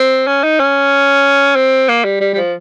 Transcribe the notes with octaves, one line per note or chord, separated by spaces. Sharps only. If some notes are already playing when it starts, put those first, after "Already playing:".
Already playing: C4
C#4
D#4
C#4
C4
A#3
G3
G3
G3
F3